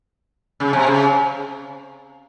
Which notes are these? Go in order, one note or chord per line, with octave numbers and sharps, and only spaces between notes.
C#3
C3
C#3